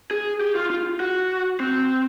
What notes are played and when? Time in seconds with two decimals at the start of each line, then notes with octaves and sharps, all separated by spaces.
0.11 G#4
0.41 G4
0.55 F4
0.70 F4
1.00 F#4
1.60 C4